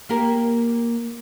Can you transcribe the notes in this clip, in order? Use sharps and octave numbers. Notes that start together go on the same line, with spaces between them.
A#3 G4 A#4